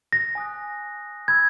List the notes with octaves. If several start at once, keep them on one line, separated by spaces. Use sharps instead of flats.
A#6
G#5 D#6 F#6
B5 E6 G#6